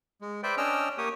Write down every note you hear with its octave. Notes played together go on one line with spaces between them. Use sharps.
G#3
B4 C5 D5 E5 G5
C#4 D4 D#5 G5 E6 F6
A#3 G4 C#5 D#6